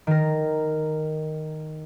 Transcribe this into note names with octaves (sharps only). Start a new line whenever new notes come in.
D#3 A#4